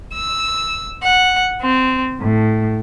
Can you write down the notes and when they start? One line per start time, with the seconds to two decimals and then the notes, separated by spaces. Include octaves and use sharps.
0.14 E6
1.03 F#5
1.62 C4
2.21 A2